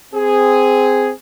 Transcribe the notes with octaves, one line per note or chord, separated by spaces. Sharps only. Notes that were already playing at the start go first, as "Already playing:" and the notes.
C4 G#4